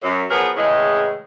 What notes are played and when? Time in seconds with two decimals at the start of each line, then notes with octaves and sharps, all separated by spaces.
0.03 F#2
0.30 F3 F#3 B3 G#4 A#4
0.56 A2 C#3 E3 G#3